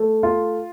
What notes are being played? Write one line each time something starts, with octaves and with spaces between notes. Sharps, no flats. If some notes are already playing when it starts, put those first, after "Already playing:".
Already playing: A3
F4